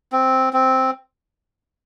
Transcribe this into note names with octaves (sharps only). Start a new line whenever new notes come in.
C4
C4